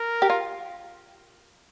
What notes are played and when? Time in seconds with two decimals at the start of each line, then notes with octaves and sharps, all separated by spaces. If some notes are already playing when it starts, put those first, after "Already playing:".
Already playing: A#4
0.22 G4
0.30 F4